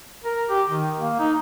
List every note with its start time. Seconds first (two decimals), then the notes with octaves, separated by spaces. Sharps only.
0.24 A#4
0.50 G4
0.68 D#3
1.00 A#3
1.19 D#4